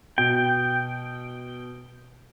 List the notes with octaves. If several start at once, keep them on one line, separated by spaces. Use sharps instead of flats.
B2 G5